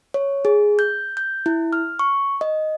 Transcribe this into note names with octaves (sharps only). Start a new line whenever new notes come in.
C#5
G#4
G6
G6
E4
F6
C#6
D#5